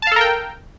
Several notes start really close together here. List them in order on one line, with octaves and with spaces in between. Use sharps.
A5 F5 A4 A#4 G5